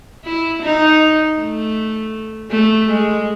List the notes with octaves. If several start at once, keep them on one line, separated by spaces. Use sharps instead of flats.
E4
D#4
A3
A3
G#3